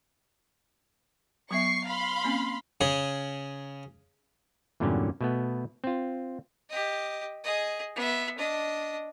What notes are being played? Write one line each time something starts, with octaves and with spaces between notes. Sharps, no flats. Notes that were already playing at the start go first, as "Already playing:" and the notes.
F#3 B3 E5 C#6 C7
F5 B5 C6
A#3 C4 C#4
C#3 G#4
E2 G2 A#2 D3 F#3 C#4
B2 A3 B3
C4 F4
G4 D#5
G#4 D#5
B3 E5
D4 D#5